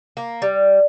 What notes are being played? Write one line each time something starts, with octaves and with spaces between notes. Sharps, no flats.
A#3
G3